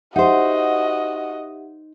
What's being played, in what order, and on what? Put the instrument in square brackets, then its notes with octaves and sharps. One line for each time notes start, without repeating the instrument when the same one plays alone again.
[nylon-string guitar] D#4 C5 [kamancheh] F#4 D#5 [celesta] G4 E5 F#5